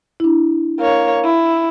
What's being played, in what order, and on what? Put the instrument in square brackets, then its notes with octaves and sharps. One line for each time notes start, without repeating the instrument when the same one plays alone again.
[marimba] D4 E4
[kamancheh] A#3 C#5
E4